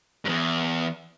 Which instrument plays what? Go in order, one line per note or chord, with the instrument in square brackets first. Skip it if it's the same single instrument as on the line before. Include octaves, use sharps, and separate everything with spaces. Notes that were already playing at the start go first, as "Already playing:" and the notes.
[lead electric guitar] E2 G2